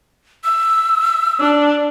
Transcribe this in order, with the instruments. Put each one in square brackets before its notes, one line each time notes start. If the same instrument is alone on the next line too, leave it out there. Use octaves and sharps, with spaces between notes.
[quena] E6
[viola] D4